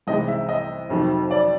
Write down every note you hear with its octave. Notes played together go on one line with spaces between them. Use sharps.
C2 C3 E3 G#3 D#5
E5
D#5
F2 C3 D#3 F#3
D5